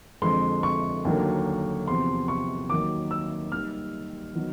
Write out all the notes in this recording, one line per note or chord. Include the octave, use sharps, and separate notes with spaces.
F2 D3 F3 G#3 C6
C#6
D#2 D3 F#3 A#3
E2 C3 F3 C6
C#6
D#2 D#3 F#3 A#3 D6
E6
D#2 D#3 G3 F6
D#3 F#3 B3